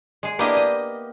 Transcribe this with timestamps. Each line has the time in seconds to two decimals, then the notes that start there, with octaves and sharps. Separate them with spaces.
0.23 G#3 G#4
0.39 A#3 B3 D4 E4 G4 D#5
0.57 D#5